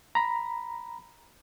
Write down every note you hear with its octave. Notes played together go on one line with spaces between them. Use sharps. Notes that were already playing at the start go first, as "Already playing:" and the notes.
A#5 B5